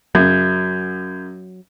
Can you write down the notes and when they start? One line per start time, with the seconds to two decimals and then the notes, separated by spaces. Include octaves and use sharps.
0.15 F#2 C#3 F#3 G6 G#6